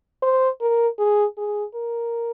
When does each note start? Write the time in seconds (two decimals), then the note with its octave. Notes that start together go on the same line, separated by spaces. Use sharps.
0.22 C5
0.61 A#4
0.98 G#4
1.37 G#4
1.74 A#4